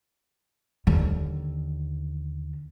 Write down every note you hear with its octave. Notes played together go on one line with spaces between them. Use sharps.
D#2 D3